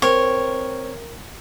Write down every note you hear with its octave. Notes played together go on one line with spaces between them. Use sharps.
C4 A#4 C#5